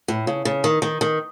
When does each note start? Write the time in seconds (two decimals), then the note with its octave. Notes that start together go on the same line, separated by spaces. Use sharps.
0.08 A2
0.27 C#3
0.45 C#3
0.64 D#3
0.82 D#3
1.01 D#3